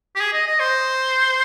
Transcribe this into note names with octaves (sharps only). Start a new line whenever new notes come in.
G4
G#4
D#5
D#5
C5